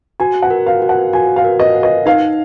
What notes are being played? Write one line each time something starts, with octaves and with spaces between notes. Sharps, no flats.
F#4 G#5
F#5
A#4
F5
F#4
F#5
F#4 G#5
F5
A#4
D#5
F#5
D#5
D#4 F5